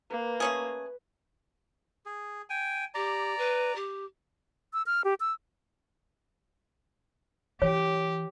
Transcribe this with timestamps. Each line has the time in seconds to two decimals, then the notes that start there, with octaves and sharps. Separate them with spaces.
0.10 A#3 B4
0.40 A3 C#4 G#4
2.06 G#4
2.50 G5 G#5
2.94 G4 D5 A#5
3.38 B4
3.75 G4
4.73 E6
4.86 F6
5.04 G4
5.20 E6
7.62 E3 G4 C#5